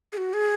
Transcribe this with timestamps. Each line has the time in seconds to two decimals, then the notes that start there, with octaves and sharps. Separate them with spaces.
0.13 G#4
0.17 F#4
0.33 G#4